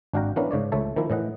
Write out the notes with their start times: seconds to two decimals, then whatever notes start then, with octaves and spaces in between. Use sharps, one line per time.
0.13 G#1 D4 F#4 F5 G5 A#5
0.36 E3 B3 C#4 D4 A#4 F5
0.51 G#2 C#3 C#5 D5
0.72 C#2 A3 C#5 E5 A5
0.96 D#3 F3 A#3 E4
1.10 A2 E3 D#5 F#5